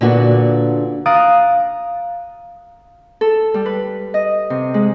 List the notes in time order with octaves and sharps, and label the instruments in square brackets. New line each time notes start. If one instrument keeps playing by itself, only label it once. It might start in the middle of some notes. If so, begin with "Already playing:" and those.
[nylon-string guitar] A#2 D3 A#3 B3 D4 F#4
[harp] F5 A#5 D#6 F#6 A6 D7
A4
G3
B4
D#5
C3
G#3